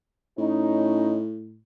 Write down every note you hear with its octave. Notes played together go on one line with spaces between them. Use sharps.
A2 C#4 D#4